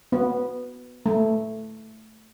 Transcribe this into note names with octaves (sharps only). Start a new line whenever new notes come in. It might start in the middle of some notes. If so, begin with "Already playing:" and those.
B3
A3